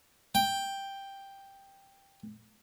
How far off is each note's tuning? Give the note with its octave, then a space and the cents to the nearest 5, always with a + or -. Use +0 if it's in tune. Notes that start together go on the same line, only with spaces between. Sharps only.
G5 +5